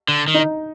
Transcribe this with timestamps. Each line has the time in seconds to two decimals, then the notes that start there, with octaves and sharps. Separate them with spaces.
0.08 D3
0.28 D#3
0.34 D#4